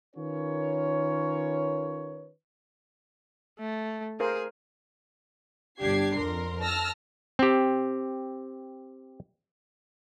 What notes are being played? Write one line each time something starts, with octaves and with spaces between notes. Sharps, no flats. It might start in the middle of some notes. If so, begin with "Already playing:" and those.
D#3 C#4 F4 A#4 B4 C#5
A3
G#4 A#4 C5 F5
G1 D4 G4 G#6 C7
F2 A#4 C6
A5 E6 F6 A#6
C4 G4